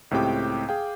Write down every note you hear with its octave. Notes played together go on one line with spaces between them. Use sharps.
C#2 A2 C4 G4 G5 D6
G#4 F5 G5